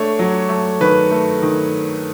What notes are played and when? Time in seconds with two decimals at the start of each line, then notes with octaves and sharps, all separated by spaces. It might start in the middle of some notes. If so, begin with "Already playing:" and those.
Already playing: A3 D4 C#5
0.19 F#3
0.49 A3
0.81 D#3 B4
1.11 A3
1.42 D#3